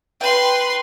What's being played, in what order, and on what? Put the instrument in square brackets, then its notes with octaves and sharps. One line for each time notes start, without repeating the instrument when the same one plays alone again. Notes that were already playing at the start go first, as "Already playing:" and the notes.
[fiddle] B4 C6 [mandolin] G5